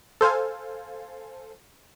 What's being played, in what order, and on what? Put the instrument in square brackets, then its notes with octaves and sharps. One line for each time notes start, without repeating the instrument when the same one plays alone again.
[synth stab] A4 C5 F5 G#5